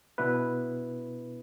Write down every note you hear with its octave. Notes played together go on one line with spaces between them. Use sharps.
B2 B3 D4 E4 B4